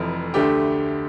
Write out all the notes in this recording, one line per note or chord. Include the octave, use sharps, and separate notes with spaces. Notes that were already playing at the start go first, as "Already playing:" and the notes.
Already playing: F1 F2 E3
D2 D3 A3 D4 G4